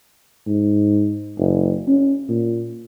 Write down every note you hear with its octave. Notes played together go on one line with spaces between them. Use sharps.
G#2
F#1
C#4
A#2